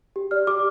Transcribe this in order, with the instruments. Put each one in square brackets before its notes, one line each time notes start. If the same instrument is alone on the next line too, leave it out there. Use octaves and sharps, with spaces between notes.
[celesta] G4
D5 F6
G4 D6